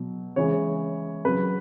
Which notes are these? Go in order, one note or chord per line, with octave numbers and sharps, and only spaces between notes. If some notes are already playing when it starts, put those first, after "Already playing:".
Already playing: B2 F#3
C#3 E3 G#3 C#5
C#3 F#3 B4